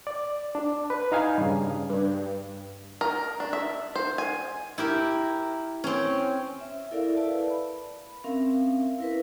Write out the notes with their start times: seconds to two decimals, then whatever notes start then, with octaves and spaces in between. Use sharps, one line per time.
0.07 D5
0.55 D4
0.90 B4
1.12 D#4 F5 G#5
1.38 G2 C#3
1.90 G2
3.01 A#4
3.40 D4
3.53 E5
3.96 C5
4.18 G#5
4.78 E4 G4 A#4
5.84 C4 C#4
6.60 E5
6.91 E4 A4 A#4 D5 E5 F5
7.16 E4 B4 D5 A5
7.50 B5
8.24 C4 C#4 A#4 E5 F5
8.98 E4 A#4 B4